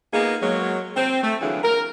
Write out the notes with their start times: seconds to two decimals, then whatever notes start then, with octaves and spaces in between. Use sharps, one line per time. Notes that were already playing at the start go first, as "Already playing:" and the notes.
0.14 A#3 B3 D#4 F4 G#4
0.42 F#3 G#3 A#3
0.96 C4
1.23 A3
1.41 D3 E3 F#3 E4 F4 G#4
1.63 A#4